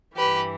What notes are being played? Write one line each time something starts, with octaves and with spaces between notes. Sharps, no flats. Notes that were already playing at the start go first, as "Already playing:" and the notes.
G2 E3 G4 B4